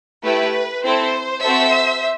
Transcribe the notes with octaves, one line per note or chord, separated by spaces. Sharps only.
A3 E4 G4 B4
C4 E4 A4 C5
C4 F#4 A4 C5 E5